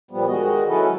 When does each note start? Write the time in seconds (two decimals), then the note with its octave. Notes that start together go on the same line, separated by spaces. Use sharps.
0.11 A#2 F3 G3 B3
0.27 D#3 G#3 F#4 D#5
0.68 F#3 C#4 E4 A4 B4